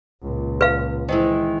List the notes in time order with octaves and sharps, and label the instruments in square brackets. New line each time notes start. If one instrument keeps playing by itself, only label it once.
[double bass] C#2 A#2
[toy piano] B4 F5
[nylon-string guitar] D#3 E3 G#3 [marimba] E4 C5